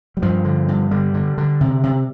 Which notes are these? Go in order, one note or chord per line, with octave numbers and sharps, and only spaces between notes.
G3
G2 F3
D3
G2
D3 G3
D3
D3
C3
C3